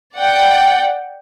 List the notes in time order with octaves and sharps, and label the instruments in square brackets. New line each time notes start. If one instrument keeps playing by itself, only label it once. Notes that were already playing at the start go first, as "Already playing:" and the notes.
[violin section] D5 F#5 G5